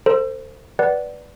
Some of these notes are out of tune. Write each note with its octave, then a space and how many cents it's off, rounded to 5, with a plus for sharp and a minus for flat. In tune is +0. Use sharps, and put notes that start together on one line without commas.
A4 +45 C5 +0
B4 +0 D5 +0 F#5 +15